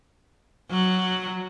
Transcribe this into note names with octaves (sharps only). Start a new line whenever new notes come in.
F#3